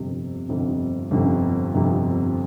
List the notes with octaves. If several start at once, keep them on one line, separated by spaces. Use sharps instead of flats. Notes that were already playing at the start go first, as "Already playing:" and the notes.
Already playing: G1 F2 C3
G1 F2 C3
G1 F2 C3
G1 F2 C3